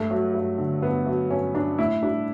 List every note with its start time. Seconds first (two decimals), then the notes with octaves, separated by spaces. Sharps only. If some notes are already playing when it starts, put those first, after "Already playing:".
Already playing: G2 A3
0.11 F#3
0.35 G2
0.58 D3
0.82 G2 B3
1.07 F#3
1.31 G2 C#4
1.54 G2 D4
1.78 A2 E4
2.03 G3 D4